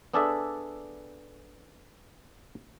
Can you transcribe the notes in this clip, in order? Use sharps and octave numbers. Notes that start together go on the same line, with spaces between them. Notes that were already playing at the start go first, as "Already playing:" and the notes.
B3 D4 G#4 A4 D5 E5